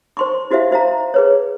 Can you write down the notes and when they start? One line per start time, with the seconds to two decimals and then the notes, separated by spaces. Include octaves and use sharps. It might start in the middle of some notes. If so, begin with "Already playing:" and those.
0.17 C5 C6 C#6
0.51 E4 F#4 G4 C5 E5 F5
0.71 F#4 C5 E5 F5 A#5
1.14 G#4 B4 C#5